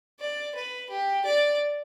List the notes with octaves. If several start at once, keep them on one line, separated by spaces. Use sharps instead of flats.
D5
B4
G4
D5